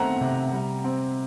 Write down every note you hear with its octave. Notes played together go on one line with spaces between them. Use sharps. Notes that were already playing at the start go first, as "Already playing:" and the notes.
Already playing: D#3 A3 C4 F#5 A#5
C3
G3
C4